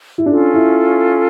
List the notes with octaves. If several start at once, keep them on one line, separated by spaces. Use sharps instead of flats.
E4
C#4 D4 F4 A4
E4